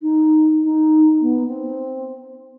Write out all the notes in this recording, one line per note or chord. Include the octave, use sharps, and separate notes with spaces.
D#4
D#4
B3
C4